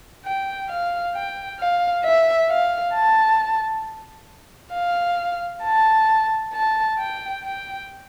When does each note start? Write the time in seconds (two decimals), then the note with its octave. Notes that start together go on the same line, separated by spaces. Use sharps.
0.25 G5
0.69 F5
1.15 G5
1.60 F5
2.05 E5
2.50 F5
2.94 A5
4.74 F5
5.63 A5
6.53 A5
6.98 G5
7.43 G5